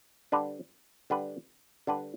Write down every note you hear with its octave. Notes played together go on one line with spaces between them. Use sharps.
D3 G3 D4 B4
D3 G3 D4 B4
D3 G3 D4 B4